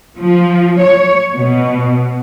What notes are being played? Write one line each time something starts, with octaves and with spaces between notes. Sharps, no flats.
F3
C#5
B2